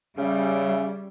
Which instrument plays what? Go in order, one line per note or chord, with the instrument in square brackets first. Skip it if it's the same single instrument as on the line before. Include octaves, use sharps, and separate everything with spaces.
[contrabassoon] C#3 [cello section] G3 [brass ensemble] C#4 E5